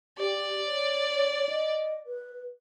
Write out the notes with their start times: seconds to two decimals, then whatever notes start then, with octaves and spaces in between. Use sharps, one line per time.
0.19 G4 D5
0.66 C#5
1.49 D#5
2.06 B4